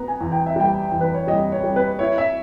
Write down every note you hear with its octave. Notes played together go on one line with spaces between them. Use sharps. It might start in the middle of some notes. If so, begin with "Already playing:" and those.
Already playing: B3 A#5
G#5
E2
G5
E5
G3 G5
E2
B4
C#5
G3 D#5
C#5
G3
B4
E4 C#5
E5